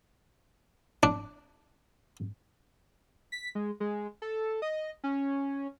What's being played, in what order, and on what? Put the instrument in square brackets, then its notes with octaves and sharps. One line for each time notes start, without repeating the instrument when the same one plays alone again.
[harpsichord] D4
[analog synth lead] B6
G#3
G#3
A4
D#5
C#4